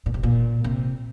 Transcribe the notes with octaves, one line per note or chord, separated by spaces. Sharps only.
A#2
C3
A#2
C3